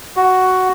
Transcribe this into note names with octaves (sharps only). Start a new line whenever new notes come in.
F#4